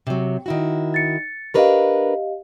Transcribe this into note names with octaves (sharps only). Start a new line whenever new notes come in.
C3 F#3
D#3 E4 F#4
A6 C#7
D4 G4 A#4 B4 D#5 F5